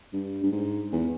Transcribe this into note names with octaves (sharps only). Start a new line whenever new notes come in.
G2
G2
G#2
E2